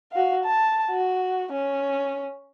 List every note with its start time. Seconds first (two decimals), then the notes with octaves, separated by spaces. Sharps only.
0.12 F#4 F5
0.44 A5
0.91 F#4
1.52 C#4